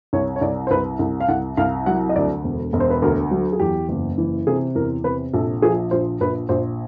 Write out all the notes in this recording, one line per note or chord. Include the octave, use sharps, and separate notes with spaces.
C2 C#5
C#5
C2 D5
C5
C2 B4
C2
F5
C2 F#5
C2 F5
F#3 F#5
D#5
D2 D5
E1
E1
C5
B4
D2 A#4
F#3
G#4
E2 G4
F#1
E3
C3 G#4
E2 A#4
C3 B4
A#1 A4
F3 G#4
A#1 C5
A#1 B4
A#1 C5